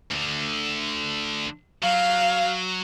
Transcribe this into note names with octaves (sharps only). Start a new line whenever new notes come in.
D2 D3
F#3 F5